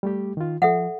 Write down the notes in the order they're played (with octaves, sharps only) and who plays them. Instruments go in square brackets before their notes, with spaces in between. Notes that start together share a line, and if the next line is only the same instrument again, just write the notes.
[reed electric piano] G3 A3 G4
D#3 F4
[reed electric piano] F3 [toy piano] A4 E5 F#5